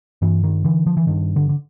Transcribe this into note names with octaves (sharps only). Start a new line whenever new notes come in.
G2 E3
D#3
D3 E3
F3
E3
G2 D#3
D3
D3